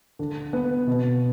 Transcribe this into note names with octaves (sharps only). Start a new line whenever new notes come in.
D3
B3
B2